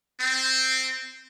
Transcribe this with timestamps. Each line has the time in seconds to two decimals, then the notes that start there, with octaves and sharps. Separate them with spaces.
0.20 C4